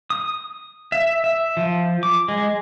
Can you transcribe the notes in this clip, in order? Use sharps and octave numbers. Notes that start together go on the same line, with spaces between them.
D#6
E5
E5
F3
D6
G#3